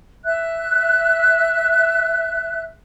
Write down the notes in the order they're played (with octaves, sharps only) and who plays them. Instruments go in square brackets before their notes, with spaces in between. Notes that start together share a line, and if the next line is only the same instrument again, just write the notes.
[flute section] E5 F#6